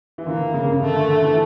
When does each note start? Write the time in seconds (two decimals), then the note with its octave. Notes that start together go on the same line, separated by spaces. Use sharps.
0.18 E3
0.26 D3 A#3
0.54 C#3
0.69 C#3
0.82 D3 A3
0.97 D3
1.10 D3
1.24 E3